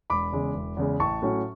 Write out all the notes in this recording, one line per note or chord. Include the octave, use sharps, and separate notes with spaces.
E1 B5 D6
E2 C#3 G#3
E1
E2 C#3 G#3
A1 A5 C#6
A2 F#3 C#4